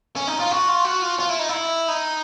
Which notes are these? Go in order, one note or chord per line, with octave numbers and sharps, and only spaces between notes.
C#4
D#4
F4
F#4
F4
F#4
F4
F4
E4
D#4
E4
D#4